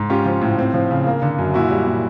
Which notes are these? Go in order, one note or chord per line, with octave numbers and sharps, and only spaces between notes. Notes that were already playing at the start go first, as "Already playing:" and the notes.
Already playing: G#2
C#4 F4 G4
F3
A2
C4
F3
C#3
A#3
D3
F#2
A#2 E4 F#4
G3
A#2